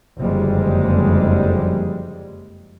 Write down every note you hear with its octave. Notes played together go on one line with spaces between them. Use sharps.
F#1 F2 D3 G3 G#3